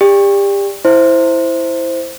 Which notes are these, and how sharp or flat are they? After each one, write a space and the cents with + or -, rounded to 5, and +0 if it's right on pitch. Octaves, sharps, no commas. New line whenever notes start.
G4 +30 D5 -5
E4 +0 C5 +0